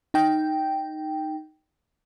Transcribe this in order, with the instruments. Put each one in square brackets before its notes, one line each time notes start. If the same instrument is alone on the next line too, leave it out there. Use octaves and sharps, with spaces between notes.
[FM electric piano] D#4 G5